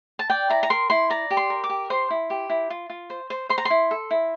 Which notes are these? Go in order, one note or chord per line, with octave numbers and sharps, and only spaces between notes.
A5
D5 G5
E4 A#5
A#5
A#4 C6
E4 C6
D5 A#5
G4
C6
A#4
D6
G4
C5 C6
E4
G4
E4
F4
F4
C5
C5
C5 C6
A#5
C6
E4
A4
E4